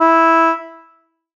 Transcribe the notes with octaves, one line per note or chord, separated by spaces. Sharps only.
E4